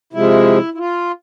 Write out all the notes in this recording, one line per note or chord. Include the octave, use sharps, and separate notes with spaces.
C3 F3 G#3 E4
E4
F4